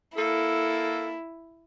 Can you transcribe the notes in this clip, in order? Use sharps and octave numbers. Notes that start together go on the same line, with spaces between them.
A#3 E4 A4